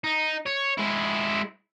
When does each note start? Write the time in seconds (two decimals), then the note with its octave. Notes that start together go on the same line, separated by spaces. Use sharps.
0.04 D#4
0.46 C#5
0.78 G#3 E4